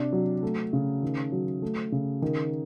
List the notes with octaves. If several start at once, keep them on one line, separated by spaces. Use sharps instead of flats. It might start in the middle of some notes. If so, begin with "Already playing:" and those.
Already playing: C3 D4
F#3
A3
C#3
D#3
F#3
A3
C#3
D#3